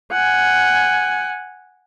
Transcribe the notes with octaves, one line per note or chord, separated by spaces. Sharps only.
F#5 G#5